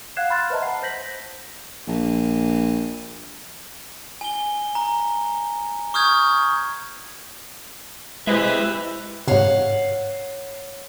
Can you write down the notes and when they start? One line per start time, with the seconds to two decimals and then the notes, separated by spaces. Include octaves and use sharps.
0.16 F5 F#5 F#6 G#6 C7 E7
0.30 B5 C6 F6 F#6 A6
0.50 B4 C5 D#5 E5 A5 A#5
0.62 F#5 C7
0.82 C5 G6 A#6 B6 F#7
1.88 A#1
4.21 G#5 G7
4.75 A#5
5.94 C#6 D#6 F6 G6 G#6
8.27 G#3 E4 G4 B4 C5 E5
9.28 G#2 C3 C#5 F5 F#5